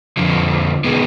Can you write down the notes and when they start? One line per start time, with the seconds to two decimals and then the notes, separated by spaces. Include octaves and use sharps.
0.17 F2 D3 F3
0.84 D#3 G#3 B3